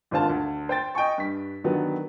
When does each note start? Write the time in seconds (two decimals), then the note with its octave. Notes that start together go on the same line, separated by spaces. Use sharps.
0.11 G#1 D3 F4 C5 A5
0.30 D2
0.69 C5 G5 A6
0.95 D#5 G5 G#5 C#6
1.18 G2 B6
1.64 D3 D#3 F#3 B3